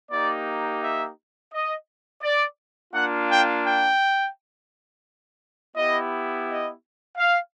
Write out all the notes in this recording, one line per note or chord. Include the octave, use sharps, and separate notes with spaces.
A#3 D#4 G4 D5
E5
D#5
D5
A#3 D4 F4 F#5
G5
G5
B3 E4 G4 D#5
D#5
F5